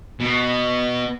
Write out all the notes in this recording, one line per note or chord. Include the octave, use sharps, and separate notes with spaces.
B2